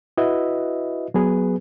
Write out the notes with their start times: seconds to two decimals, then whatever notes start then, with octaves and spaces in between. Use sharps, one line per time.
0.17 E4 F#4 B4 D#5 E5
1.14 F#3 B3 G#4 B4